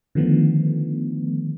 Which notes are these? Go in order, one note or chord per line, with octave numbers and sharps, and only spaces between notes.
D3 D#3 F3 A3 B3